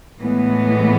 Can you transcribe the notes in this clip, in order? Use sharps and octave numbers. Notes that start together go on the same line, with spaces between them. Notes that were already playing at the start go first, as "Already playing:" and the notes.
A2 E3 G#3 B3